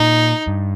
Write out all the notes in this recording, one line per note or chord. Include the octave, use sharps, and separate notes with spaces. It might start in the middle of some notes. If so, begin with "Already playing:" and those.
Already playing: A#2 D#4
G2